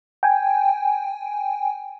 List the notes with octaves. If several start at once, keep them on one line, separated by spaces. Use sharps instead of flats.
G5 G#5